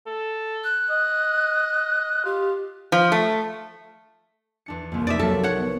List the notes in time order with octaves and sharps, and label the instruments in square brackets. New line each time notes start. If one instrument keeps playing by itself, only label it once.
[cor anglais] A4
[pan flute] F#6
[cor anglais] D#5
[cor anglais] F4 [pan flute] G4
[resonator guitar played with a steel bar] F3
A3
[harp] E2 D4 C#7
[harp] C2 F2 [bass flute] A#3
[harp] D#4 D#6 [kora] D5 E5
[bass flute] F#3 [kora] A4 [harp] A#4 E5
[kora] C#5 F#5
[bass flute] B3